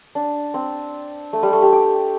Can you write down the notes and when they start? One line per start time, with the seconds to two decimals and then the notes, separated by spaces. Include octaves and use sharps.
0.15 D4
0.54 C4
1.33 A3
1.43 G3
1.53 A3
1.62 G4
1.72 G4